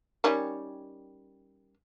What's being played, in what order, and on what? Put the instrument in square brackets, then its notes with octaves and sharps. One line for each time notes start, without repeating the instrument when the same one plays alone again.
[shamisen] D#3 G3 C#4